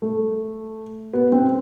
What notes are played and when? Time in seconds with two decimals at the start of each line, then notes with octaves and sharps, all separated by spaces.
0.02 A3
1.13 B3
1.32 C4